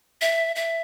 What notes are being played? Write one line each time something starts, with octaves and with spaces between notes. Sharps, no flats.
E5
E5